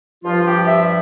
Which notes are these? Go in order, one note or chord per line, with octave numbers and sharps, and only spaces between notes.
G2 F3 F4
G4
E5